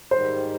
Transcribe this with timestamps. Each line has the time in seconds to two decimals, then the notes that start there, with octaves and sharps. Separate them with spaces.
0.11 G#2 D#3 G3 C5